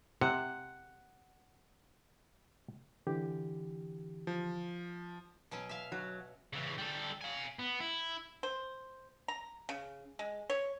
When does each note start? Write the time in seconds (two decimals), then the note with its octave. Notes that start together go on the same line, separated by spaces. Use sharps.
0.21 C3 F#5
3.07 D3 E3 G4
4.27 F3
5.51 B2 F#3 C#4
5.69 E5 F5
5.92 F#3
6.53 C#3 E3
6.78 G3 A4
7.21 F5 G#5
7.59 B3
7.80 E4
8.43 C5
9.28 A#5
9.69 C#3
10.19 G#3
10.50 C#5